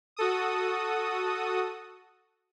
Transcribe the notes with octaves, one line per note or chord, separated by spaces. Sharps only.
F#4 A4 D#6